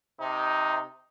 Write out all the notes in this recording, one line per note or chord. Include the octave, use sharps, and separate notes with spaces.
C3 D#4